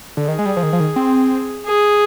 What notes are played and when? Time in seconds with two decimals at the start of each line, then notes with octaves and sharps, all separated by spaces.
0.17 D3
0.28 D#3 G#4
0.39 G#3
0.46 G3
0.57 F3
0.63 D#3
0.73 F3
0.80 D#3
0.96 C4
1.66 G#4